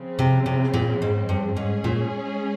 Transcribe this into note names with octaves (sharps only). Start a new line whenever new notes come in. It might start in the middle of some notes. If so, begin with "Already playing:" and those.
Already playing: C#3 F3 C4
C3
C3
A#2
G#2
G2
G#2 G#3 C#4 G#4
A#2